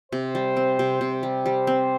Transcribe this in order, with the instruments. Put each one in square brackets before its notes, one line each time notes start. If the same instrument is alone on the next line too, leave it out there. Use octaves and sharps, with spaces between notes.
[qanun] C3 [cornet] C5
[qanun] G3
C4
C3
C3
G3
[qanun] G3 [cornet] C5
[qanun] C4